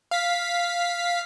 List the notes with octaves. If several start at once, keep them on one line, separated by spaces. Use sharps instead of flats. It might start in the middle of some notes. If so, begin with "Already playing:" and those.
F5 B6